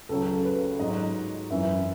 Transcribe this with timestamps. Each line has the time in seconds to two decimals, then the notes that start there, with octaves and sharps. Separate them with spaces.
0.09 C#2 C#3 F#3 A4
0.45 B4
0.79 G#2 F#3 D#5
1.50 F#2 E3 E5